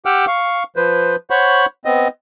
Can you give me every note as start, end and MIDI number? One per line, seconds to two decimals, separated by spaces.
0.06 0.25 67
0.06 0.25 78
0.06 0.25 79
0.06 0.25 86
0.06 0.25 88
0.06 0.25 89
0.27 0.63 77
0.27 0.63 85
0.76 1.16 53
0.76 1.16 71
0.76 1.16 72
1.30 1.66 72
1.30 1.66 73
1.30 1.66 78
1.30 1.66 83
1.30 1.66 85
1.85 2.08 59
1.85 2.08 60
1.85 2.08 75